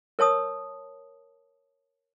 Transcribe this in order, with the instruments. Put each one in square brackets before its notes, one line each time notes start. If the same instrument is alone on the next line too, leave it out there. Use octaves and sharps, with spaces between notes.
[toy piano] A#4 C#5 A5 D#6